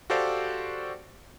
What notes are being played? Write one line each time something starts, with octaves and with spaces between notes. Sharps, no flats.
F#4 G4 A4 C5 D5 F5